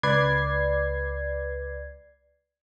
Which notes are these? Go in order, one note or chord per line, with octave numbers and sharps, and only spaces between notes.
C#2 B4 D5 G#6 C7